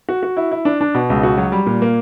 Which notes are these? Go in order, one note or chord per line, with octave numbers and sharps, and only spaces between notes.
F#4
F#4
E4
E4
D4
D4
B2
C#2
F#4
F#3
G3
A#2
A#3